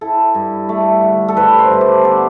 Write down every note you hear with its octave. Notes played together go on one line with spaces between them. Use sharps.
E4 A4
G2
A3
D3
A4
G2 B4
C5
G2 E5
D5
B3 D5